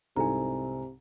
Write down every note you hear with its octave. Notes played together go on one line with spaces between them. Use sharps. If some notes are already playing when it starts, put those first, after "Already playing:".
C2 G#2 C3 A4 G#5 A#5